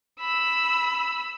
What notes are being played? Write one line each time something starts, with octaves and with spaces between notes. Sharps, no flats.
B5 E6